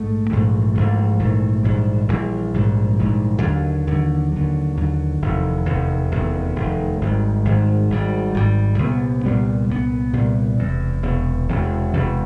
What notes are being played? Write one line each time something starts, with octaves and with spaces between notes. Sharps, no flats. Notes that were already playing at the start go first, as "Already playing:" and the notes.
Already playing: A#1 G#2 A3
A#1 G#2 E3 A3
A#1 G#2 E3 A3
A#1 G#2 E3 A3
A#1 G#2 E3 G3
A#1 G#2 E3 G3
A#1 G#2 E3 G3
A#1 G#2 E3 G3
D#2 D3 F#3
D#2 D3 F#3
D#2 D3 F#3
D#2 D3 F#3
F1 E2 C3 D#3
F1 E2 C3 D#3
F1 E2 C3 D#3
F1 E2 C3 D#3
G#1 G#2 D#3 G3
G#1 G#2 D#3 G3
G#1 G#2 D#3 G3
G#1 G#2 D#3 G3
C2 A#2 G3 B3
C2 A#2 G3 B3
C2 A#2 G3 B3
C2 A#2 G3 B3
E1 E2 C3
E1 E2 C3
E1 E2 C3
E1 E2 C3